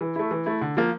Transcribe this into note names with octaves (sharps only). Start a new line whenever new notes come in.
E3
A3 E4
E3
A3 E4
D3
F3 A#3